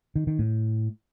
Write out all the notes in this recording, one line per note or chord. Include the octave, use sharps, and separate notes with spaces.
D#3
D#3
A2